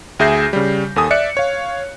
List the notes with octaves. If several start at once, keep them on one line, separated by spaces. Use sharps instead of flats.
D2 G#4 E5 G6 A#6 C7
C#3 G3
D#2 A4 G#5 D#6
D5 E5 F#6 C#7
C#5 F5